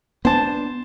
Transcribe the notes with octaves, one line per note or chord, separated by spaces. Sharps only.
B3 D4 C5 A5